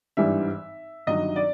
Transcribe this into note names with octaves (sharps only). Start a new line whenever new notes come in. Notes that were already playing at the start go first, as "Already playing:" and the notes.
G#1 G2 E3 G3 E5
G1 G2 D#3 F#3 D#5
D5